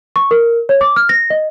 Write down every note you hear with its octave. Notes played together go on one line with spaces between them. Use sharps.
C#6
A#4
C#5
D6
F6
A#6
D#5